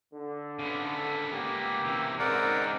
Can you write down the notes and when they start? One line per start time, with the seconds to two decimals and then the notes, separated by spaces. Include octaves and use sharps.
0.14 D3
0.59 C#3 B3
1.32 A#3 G4
1.85 C3 E3
2.19 G#2 C#3 C4 A#4 D5 F#5